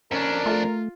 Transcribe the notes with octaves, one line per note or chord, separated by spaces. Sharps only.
F2 C#4 D4 A#4
A3 F4